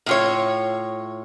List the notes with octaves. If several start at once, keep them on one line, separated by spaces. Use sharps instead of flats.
A2 F4 C#5